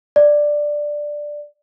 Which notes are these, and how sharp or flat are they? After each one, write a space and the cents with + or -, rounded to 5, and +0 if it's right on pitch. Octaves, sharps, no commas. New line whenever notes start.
D5 +5